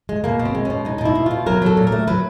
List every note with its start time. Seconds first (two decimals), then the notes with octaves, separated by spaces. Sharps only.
0.09 G#3
0.24 B2 A#3
0.39 B2
0.45 C4
0.55 G#3
0.65 B2 C#4
0.85 G#3 D#4
0.98 D#4
1.01 B2 E4
1.15 B2
1.26 B2 F4
1.46 F#3 A#4
1.62 F#3 A4
1.77 A#2
1.87 A#4
1.92 A3
2.07 F#3 B4